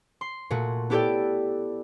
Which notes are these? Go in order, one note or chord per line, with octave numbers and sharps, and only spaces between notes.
C6
A#2 A3 F#4
B3 E4 G4 A4 D5 G5